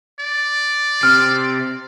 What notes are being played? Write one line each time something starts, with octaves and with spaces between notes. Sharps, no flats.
D5
C3 C4 F6